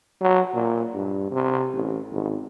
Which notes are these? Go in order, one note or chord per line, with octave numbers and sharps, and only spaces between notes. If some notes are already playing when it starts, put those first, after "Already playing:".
F#3
A#2
G2
C3
A1
G#1